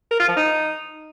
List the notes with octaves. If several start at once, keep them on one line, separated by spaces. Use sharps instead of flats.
A#4
F4
F3
D#4